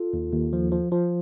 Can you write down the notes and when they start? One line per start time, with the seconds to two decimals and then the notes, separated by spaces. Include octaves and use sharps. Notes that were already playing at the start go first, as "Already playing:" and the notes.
Already playing: F4 A4
0.13 D#2
0.33 D#2
0.53 F3
0.72 F3
0.92 F3